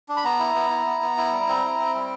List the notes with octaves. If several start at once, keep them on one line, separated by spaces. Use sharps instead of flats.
D4
B5
B3 A#5
E4
B3
E4
B3
B3
E4
G3
C4
E4
C4
G3